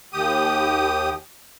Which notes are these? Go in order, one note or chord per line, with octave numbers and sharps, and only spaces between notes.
D#2 G4 D#6